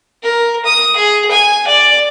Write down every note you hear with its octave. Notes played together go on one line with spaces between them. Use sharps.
A#4
D#6
G#4
G#5
D5